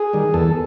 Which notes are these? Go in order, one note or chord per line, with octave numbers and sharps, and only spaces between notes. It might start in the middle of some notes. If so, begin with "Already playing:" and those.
Already playing: G#4
D#3 G3
E2 A4